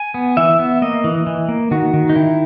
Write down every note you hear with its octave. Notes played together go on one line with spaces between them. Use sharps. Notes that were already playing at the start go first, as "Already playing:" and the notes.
Already playing: G#5
B3
E3 E5
B3
A#3 D#5
E3
E3
A#3
D#3 F#4
D#3
D#4
D#3 E4